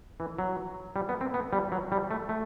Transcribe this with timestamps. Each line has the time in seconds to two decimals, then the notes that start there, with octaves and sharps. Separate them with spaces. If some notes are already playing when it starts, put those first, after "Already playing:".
0.20 E3
0.39 F#3
0.96 G3
1.09 B3
1.21 C4
1.34 B3
1.53 G3
1.72 F#3
1.92 G3
2.11 A3
2.29 A3